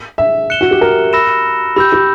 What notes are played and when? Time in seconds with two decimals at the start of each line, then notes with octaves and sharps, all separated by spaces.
0.18 E5
0.50 F#6 C#7 E7 G7
0.61 F#4
0.71 G4
0.81 A#4
1.13 B5 E6 A#6 E7
1.76 G4 B5 E6 G6
1.92 G4